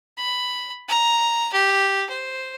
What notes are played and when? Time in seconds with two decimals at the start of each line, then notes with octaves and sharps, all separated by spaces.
0.17 B5
0.88 A#5
1.53 G4
2.10 C5